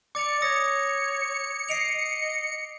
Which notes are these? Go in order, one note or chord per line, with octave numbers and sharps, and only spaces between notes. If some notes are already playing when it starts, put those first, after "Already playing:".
D5 D6 A6 C#7 F7
C#5 D#6 A#6
D#5 C7 D7 F7